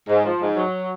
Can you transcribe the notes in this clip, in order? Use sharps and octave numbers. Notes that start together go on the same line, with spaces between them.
G#2
F3
G#2
F#3